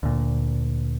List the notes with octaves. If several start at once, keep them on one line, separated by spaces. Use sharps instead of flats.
D2 A#2